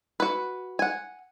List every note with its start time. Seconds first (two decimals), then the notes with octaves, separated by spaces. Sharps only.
0.20 F#4 B4
0.79 F#5 G#5